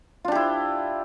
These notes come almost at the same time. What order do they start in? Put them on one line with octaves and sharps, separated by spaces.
F4 D4 G4 E4